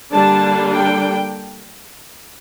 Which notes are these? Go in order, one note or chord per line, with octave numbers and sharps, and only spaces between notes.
D3 G3 A#3 D4 A5
G5